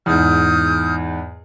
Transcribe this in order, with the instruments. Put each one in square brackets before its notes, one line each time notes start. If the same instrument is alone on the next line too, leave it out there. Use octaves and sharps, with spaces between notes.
[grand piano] E2 G#2 [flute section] D#6 F6 G6